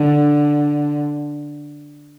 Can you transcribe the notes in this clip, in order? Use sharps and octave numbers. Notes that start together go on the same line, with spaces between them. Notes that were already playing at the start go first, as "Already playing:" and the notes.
Already playing: D3